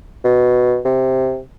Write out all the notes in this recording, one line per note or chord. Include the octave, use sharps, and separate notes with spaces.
B2
C3